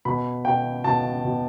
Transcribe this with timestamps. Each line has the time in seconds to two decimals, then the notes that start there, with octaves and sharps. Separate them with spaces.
0.05 B2 B5
0.45 B2 G5
0.84 B2 A5
1.24 B2